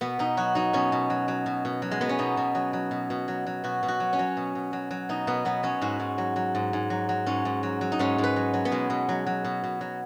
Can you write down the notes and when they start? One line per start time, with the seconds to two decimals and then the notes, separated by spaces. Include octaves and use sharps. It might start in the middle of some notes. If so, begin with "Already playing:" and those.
0.01 B2 B3
0.19 B2 D#4
0.37 F#3 F#4
0.55 F#3 D#4
0.73 B2 C#4
0.92 B2
1.10 F#3
1.28 F#3
1.46 B2
1.65 B2
1.82 F#3
1.91 G#3
2.01 F#3 B3
2.09 C#4
2.19 B2 D#4
2.37 B2
2.55 F#3
2.73 F#3
2.91 B2
3.10 B2
3.28 F#3
3.47 F#3
3.64 B2 F#4
3.83 B2
3.88 F#4
4.00 F#3
4.13 C#4
4.19 F#3
4.37 B2
4.55 B2
4.73 F#3
4.91 F#3
5.09 B2 D#4
5.27 B2 B3
5.45 F#3 B3
5.63 F#3 C#4
5.82 G#2 F#4
6.00 G#2
6.18 F#3
6.36 F#3
6.55 G#2
6.73 G#2
6.90 F#3
7.09 F#3
7.26 G#2 C#4
7.45 G#2
7.63 F#3
7.81 F#3
7.92 D#4
7.99 G#2 C#4
8.18 G#2
8.24 B4
8.36 F#3
8.54 F#3
8.65 B3
8.72 B2 G#3
8.90 B2
9.09 F#3
9.26 F#3
9.45 B2
9.64 B2
9.81 F#3